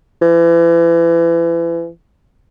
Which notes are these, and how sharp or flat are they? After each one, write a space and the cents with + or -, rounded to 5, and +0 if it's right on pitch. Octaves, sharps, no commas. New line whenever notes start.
E3 +35